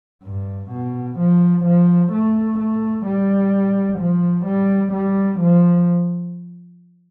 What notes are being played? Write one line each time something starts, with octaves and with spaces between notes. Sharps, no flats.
G2
B2
F3
F3
A3
A3
G3
F3
G3
G3
F3